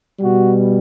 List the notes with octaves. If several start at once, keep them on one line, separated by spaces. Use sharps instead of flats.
B2 G3 F#4